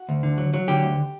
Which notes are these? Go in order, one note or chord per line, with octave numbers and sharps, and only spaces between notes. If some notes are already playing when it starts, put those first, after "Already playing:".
Already playing: F#4
D2
D3
F#3
F#3
D3 G4
D2